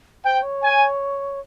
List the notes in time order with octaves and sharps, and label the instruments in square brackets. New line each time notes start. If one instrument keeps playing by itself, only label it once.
[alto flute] C5 [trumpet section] G5
[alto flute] C#5
[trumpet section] G#5